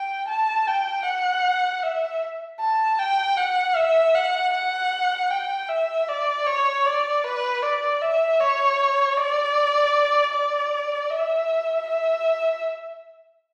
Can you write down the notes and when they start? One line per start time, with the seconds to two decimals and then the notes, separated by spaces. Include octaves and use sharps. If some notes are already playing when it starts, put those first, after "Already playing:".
Already playing: G5
0.28 A5
0.67 G5
1.05 F#5
1.83 E5
2.60 A5
2.99 G5
3.37 F#5
3.76 E5
4.15 F#5
4.53 F#5
5.30 G5
5.69 E5
6.08 D5
6.46 C#5
6.85 D5
7.24 B4
7.62 D5
8.01 E5
8.40 C#5
9.17 D5
10.33 D5
11.10 E5
11.87 E5